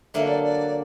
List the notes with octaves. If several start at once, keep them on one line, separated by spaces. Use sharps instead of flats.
D3 F#3 A#3 D4 E5
C#5
D5
D5